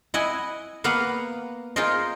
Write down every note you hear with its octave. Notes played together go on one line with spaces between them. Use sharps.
E4 D#5 F#5 G#5
A#3 B3 B4 F5 F#5
D#4 F4 G#4 A#4 C5 D#5